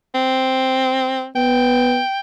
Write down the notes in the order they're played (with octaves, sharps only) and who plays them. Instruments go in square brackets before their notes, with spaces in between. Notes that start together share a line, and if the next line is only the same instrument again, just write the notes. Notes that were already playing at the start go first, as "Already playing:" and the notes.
[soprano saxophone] C4
[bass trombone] B3 [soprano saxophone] G5